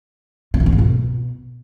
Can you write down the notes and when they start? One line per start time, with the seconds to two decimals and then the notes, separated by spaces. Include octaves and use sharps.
0.54 C#3
0.60 A#2
0.66 F2
0.72 G#2
0.78 B2